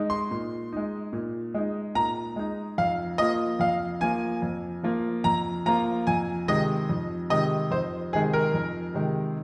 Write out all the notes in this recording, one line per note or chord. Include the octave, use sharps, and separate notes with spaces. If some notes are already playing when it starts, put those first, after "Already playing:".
Already playing: G#3 D#4
C6
A#2
G#3 D#4
A#2
G#3 D#4
A#2 A#5
G#3 D#4
F2 F5
F3 A#3 F4 D#5
F2 F5
F3 A#3 F4 G#5
F2
F3 A#3 F4
F2 A#5
F3 A#3 F4 A#5
F2 G#5
C3 D#3 G#3 D#5
F2
C3 D#3 G#3 D#5
F2 C5
C3 D#3 G#3 G#4
A#4
F2
C3 D#3 G#3